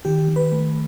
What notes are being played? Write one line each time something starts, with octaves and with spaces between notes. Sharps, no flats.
D#3 G4
D#3
B4
A3